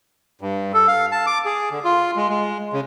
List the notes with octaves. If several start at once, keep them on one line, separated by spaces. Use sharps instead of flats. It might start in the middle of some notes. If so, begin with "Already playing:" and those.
G2
A4
F5
A5
D6
G#4
D3
F4
G#3
G#3
C#3